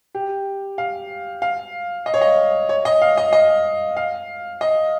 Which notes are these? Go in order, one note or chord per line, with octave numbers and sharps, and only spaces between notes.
G4
F5
F5
D#5
C#5
D#5
C#5
D#5
F5
D#5
D#5
F5
D#5